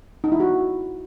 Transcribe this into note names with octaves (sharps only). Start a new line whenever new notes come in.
D#4
E4
F#4